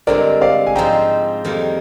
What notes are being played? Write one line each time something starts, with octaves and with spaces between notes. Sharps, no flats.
G2 D3 G#3 C4 A#4 D5
D5 F5
G#5
G#2 F3 C4 D#4 G5 A#5
F2 D#3 G3 A#3